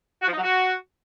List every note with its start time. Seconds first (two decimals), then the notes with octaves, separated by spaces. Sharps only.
0.22 F#4
0.27 F3
0.33 D#4
0.38 F#3
0.43 F#4